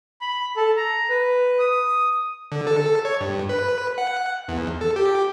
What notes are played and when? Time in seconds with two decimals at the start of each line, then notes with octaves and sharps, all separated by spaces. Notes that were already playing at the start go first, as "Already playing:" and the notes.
0.22 B5
0.57 A4
0.77 A#5
1.10 B4
1.59 D#6
2.52 D3
2.67 A4
3.05 C#5
3.21 G2
3.49 B4
3.98 F#5
4.48 E2
4.81 A4
4.96 G4